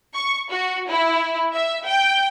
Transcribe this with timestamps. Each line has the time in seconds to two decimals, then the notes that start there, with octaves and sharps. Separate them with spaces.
0.14 C#6
0.50 F#4
0.89 E4
1.54 E5
1.85 G5